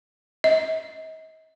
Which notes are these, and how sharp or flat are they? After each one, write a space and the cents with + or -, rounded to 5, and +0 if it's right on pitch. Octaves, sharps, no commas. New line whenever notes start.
D#5 +40